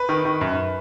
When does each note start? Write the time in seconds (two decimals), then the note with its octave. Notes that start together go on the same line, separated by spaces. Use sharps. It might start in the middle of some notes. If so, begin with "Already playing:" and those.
Already playing: B4
0.09 D#3
0.25 D#3
0.41 F#2